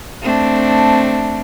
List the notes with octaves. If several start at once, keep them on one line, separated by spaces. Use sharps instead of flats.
A3 C4 D4